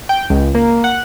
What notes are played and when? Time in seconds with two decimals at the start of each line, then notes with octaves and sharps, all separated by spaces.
0.09 G5
0.30 C#2
0.55 A#3
0.84 F#5